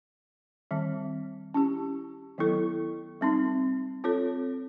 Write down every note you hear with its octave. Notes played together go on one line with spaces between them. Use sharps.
D#3 G3 C4
C#4 E4 G4
D#3 F#3 B3 E4 A4
G3 C4 D#4
C4 F4 A4 C#5